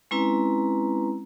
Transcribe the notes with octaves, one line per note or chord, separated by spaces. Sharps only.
G#3 C4 C#4 E4 B4 A#5